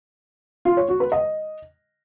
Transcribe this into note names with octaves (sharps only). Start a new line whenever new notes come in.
F4
C#5
F#4
B4
D#5